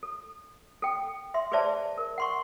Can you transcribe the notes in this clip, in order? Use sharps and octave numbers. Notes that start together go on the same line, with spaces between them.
A4
A4 G5
E5 C6
G#4 B4 C5 D5 E5 A5
A#4
F#5 C6 C#6